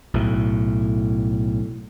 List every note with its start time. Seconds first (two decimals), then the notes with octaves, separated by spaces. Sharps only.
0.14 B1 A2